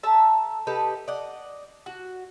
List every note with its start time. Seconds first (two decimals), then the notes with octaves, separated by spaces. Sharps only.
0.03 A4 E5 A5 A#5
0.67 D#4 G4 A4 B4
1.08 D5 D#5 F#5
1.86 F#4